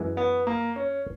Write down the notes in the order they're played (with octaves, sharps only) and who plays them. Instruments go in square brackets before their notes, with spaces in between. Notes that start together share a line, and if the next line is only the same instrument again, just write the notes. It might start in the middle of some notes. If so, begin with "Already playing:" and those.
Already playing: [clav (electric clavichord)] F#2 E3 G#3
[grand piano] B3
A#3
C#4